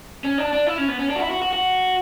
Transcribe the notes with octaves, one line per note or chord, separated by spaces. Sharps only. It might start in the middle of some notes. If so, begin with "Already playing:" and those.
C#4
D4
D4
E4
C#4
B3
C#4
D4
F#4
E4
F#4
F#4
F#4